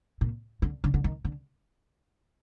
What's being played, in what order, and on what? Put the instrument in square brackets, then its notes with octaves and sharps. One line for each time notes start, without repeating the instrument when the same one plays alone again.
[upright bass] A#2
D3
D3
D3
D#3
D3